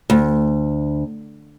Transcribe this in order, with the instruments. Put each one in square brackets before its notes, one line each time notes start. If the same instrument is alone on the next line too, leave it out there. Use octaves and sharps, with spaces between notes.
[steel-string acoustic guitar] D2